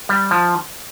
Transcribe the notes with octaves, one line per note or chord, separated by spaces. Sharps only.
G3
F3